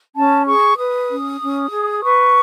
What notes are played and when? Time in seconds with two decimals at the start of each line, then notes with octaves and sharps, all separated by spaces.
0.15 C#4 A5
0.46 G#4 C#6
0.78 B4 D#6
1.10 C#4
1.40 C#4
1.72 G#4
2.03 B4 C#6